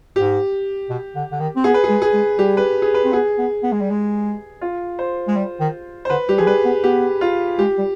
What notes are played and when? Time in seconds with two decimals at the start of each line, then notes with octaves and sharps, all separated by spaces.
0.16 G#2 G4
0.90 B2
1.16 D3
1.32 D3
1.40 D#3
1.56 C4
1.64 B3 G#4
1.74 B4
1.84 G#4
1.89 G#3
2.02 G#4
2.14 G#3
2.38 G3 G4
2.57 B4
2.82 G#4
2.94 B4
3.05 C4
3.12 B3 G#4
3.38 B3
3.63 B3
3.72 G#3
3.80 G3
3.90 G#3
4.61 F4
4.99 C5
5.28 G#3
5.36 G3
5.60 D#3
6.05 C5
6.10 D3 B4
6.29 G3 G4
6.38 F3 G#4
6.47 G3 B4
6.65 B3
6.84 B3 G4
7.21 F4
7.59 G#3 G4
7.78 G3